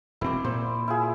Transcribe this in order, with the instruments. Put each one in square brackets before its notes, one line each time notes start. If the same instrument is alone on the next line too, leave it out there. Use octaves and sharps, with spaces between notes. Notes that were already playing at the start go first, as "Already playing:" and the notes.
[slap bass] E1 C4 [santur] E4 D6
[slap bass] A#2 [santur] C5
[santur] E4 F4 G#4